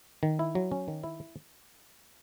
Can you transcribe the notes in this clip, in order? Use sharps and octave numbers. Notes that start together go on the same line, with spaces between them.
D#3
E4
F#3
C#4
D#3
E4